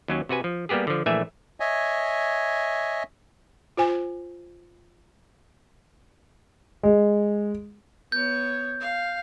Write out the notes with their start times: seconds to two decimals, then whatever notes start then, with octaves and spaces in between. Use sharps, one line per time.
0.08 D#2 F#3 C#4
0.29 C3 F#4 B4 G#5
0.44 F3
0.69 G3 A#3 B3 G4 G#4
0.87 D3 F3
1.06 A#1 E3 A3 E5 G#5
1.60 C#5 D#5 E5 G#5
3.77 F4 C5 G#5
6.83 G#3
8.12 B3 C#5 G6
8.80 F5